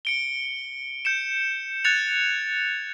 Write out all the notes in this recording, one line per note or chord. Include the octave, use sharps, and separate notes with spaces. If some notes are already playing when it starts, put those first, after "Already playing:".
C#7 D7 G7
G6 C#7 E7
F#6 G#6 A6 C#7 F7